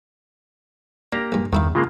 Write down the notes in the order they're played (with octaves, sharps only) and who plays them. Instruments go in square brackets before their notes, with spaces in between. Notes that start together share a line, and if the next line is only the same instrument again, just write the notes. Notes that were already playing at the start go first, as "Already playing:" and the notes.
[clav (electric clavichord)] A#3 G4 A#5 [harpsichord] D4
[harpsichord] A#1 G2
[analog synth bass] E2 [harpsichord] G2 E4 F5 [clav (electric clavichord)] D#3
[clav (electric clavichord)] C#3 G#3 A#3 [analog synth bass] F4